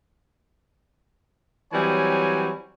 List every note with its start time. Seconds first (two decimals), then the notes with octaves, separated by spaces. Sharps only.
1.73 E3 F#3 G3 C4 C#5 G#5